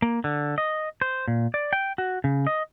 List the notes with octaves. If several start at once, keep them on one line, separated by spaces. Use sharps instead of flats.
A#3
D3
D#5
C5
A#2
D5
G5
F#4
C#3
D#5